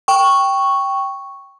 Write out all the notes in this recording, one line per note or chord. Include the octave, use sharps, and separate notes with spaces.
G5 C#6